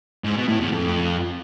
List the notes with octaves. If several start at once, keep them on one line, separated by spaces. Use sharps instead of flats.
G#2
B2
A2
E2
F2